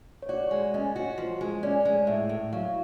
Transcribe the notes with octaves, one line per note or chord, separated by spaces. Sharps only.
C#5
F#4 D5
G#3
C#4 D#5
F#4
F3
G#3
C#4 D5
G#3
A2 E5
A2
F#3 F5